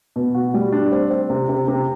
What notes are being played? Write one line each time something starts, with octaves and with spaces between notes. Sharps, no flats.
B2
F#4
G3
D4
C4
C4
C3
C3
C3